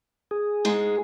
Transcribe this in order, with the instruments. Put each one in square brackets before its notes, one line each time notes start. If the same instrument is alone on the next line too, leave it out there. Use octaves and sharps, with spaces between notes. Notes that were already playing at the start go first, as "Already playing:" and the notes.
[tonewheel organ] G#4
[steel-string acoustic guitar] G#2 G#3